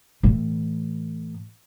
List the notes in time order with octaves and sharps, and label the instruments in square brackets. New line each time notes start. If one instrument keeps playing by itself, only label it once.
[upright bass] A2 E3